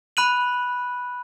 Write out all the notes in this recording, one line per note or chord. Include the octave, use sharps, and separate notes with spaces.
B5 F#6 D#7 F#7